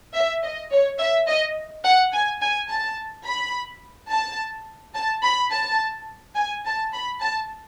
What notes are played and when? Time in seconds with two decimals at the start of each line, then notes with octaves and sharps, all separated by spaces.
0.15 E5
0.43 D#5
0.72 C#5
1.00 E5
1.28 D#5
1.85 F#5
2.13 G#5
2.42 G#5
2.69 A5
3.26 B5
4.11 A5
4.96 A5
5.24 B5
5.52 A5
6.36 G#5
6.65 A5
6.93 B5
7.21 A5